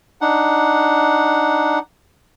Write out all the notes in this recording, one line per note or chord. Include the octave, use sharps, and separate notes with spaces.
D4 D#4 F#5